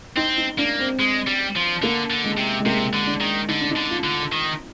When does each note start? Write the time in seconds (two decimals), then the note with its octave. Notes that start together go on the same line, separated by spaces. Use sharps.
0.17 C4 D#4
0.38 D#4
0.58 A#3 D4
0.80 C4
0.99 G#3
1.27 G3
1.55 F3
1.82 D3 A#3
2.11 D3
2.24 G#3
2.37 C3
2.60 G#3
2.66 C3 A#3
2.93 D3
3.07 D4
3.21 D#3
3.48 D3 D#4
3.61 D4
3.71 D#4
3.76 D3
3.90 F4
4.04 D3
4.32 D#3